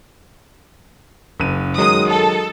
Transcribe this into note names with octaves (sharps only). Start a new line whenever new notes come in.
F#1 D#7
D#3 F#3 G#3 D#6
A4